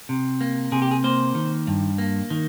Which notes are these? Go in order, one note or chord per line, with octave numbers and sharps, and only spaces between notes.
C3
A#3
C3 G#4
G4
G#4
A#3 C5
D#3
G2
A#3
D#3